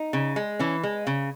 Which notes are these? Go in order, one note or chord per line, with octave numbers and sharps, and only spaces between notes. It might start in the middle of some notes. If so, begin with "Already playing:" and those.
Already playing: D#4
C#3
G#3
E3 C#4
G#3
C#3